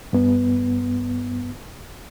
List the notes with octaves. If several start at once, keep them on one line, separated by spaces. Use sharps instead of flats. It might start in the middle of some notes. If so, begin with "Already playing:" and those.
G2 B3